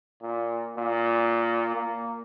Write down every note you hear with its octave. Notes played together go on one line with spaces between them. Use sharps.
A#2
A#2
A#3